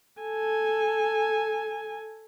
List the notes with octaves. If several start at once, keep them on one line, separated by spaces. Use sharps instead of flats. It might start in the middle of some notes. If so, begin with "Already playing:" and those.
A4 G#5